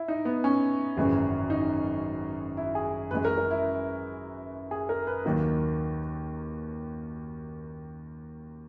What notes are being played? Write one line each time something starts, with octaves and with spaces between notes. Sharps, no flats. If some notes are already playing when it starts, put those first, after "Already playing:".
Already playing: E4
D#4
B3
C#4
G#1 F#2 C#3 E3 G#3
D#4
E4
G#4
F#2 E3 G#3 B4
A#4
A#4
E4
G#4
A#4
B4
D#2 D#3 F#3 A#3